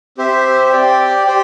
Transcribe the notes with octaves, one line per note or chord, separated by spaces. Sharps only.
C4 G4 C5 E5
G4 D5 G5
G4 C5 G5